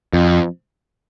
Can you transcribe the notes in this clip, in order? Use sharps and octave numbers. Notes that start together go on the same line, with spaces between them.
F2